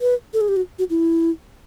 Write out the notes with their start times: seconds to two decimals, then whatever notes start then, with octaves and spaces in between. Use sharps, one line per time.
0.01 B4
0.34 A4
0.41 G#4
0.49 G4
0.56 F#4
0.79 F#4
0.90 E4